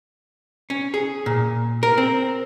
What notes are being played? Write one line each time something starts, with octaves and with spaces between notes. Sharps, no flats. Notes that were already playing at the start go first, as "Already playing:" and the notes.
C#4
G#4
A#2
A#4
C4